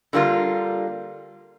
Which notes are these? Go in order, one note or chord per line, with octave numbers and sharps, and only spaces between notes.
D3 G3 A#3 F4